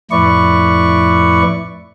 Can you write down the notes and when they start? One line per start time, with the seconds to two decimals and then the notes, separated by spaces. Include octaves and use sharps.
0.11 F2 A2 E4 B4 D5 C#6